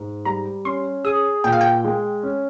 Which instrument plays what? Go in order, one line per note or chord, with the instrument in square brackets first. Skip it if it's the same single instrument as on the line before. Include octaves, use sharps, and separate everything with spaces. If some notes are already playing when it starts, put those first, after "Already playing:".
Already playing: [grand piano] G#2
[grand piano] G3 [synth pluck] A#5
[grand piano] C#4 [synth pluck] C6
[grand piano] G#4 [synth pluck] D#6
[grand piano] A#2 [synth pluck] G5
[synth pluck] F5
G5
[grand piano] G#3
C#4